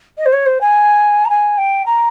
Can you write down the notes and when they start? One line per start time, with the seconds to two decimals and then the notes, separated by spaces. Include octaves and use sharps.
0.18 D#5
0.25 C5
0.32 C#5
0.46 C5
0.61 G#5
1.25 A#5
1.29 G#5
1.57 G5
1.86 A#5